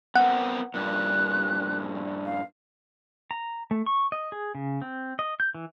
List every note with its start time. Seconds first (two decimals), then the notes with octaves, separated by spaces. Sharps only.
0.16 B3 C4 A#4 F#5
0.74 G2 A#2 F#6
2.25 F5
3.31 A#5
3.71 A3
3.86 C#6
4.12 D#5
4.32 G#4
4.55 C#3
4.82 C4
5.19 D#5
5.40 G6
5.55 E3